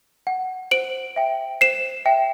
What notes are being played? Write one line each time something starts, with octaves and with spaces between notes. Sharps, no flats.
F#5
C5 D7 F#7
E5 G5
C5 C7 E7
E5 G5